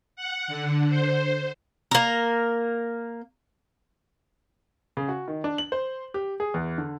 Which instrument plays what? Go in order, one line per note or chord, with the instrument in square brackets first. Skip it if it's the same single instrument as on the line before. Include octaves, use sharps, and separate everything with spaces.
[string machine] F#5
D3
C5
[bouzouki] A#3 A#4
[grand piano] C#3
F#4
D#3
D4
F#7
C5
G4
G#4
E2
D3